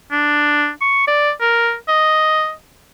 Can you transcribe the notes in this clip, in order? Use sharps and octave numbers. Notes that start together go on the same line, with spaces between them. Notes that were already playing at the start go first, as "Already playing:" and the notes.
D4
C#6
D5
A#4
D#5